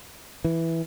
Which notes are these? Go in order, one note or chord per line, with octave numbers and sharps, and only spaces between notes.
E3